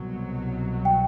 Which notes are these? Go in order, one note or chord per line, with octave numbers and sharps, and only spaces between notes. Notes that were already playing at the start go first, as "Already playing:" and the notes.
Already playing: C2 B2 F#3
G5